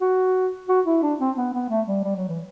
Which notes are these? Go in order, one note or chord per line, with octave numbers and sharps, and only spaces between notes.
F#4
F#4
E4
D4
C4
B3
B3
A3
G3
G3
F#3
E3